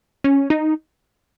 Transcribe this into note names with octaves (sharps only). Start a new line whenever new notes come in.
C#4
D#4